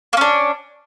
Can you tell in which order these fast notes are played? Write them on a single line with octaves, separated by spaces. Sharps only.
A#3 C#4 D4